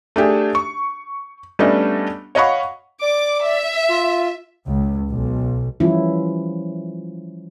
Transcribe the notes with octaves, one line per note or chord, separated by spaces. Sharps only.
A3 D4 G4 G#4
C#6
G3 A3 B3 C#4 D4 D#5
C#5 D#5 F5 F#5 B5 C#6
D5 D6
E5
F4
C#2
B1
E3 F3 G3 C#4 E4 F4